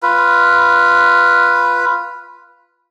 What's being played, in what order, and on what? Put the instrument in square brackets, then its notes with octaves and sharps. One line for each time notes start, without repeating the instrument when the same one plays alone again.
[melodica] F4 B4